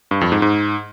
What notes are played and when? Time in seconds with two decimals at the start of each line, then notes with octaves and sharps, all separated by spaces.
0.11 G2
0.21 F2
0.32 G#2
0.42 G#2